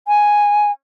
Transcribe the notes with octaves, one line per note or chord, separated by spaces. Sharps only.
G#5